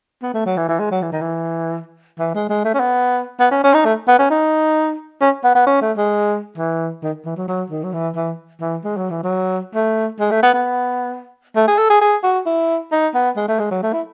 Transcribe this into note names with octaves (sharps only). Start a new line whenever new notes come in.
B3
A3
F#3
E3
E3
G#3
F#3
E3
D#3
E3
E3
G#3
G#3
A3
C#4
B3
B3
C#4
C#4
D#4
A3
B3
C#4
D#4
C#4
B3
B3
C#4
A3
G#3
E3
D#3
E3
F#3
F#3
D#3
F#3
E3
E3
E3
G#3
F#3
E3
F#3
A3
G#3
A3
B3
B3
A3
G#4
A4
G#4
G#4
F#4
E4
D#4
B3
G#3
A3
G#3
F#3
A3
E4